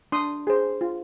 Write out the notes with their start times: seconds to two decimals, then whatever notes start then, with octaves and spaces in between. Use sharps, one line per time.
0.12 D4 C6 D#6
0.47 G#4 C5
0.81 F4